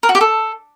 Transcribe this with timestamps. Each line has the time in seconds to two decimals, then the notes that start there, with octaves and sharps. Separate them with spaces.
0.03 A#4
0.09 F#4
0.15 G4
0.21 A4